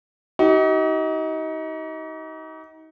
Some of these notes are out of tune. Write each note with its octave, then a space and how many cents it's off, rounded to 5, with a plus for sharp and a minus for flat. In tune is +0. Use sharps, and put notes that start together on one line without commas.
D#4 +30 G4 -45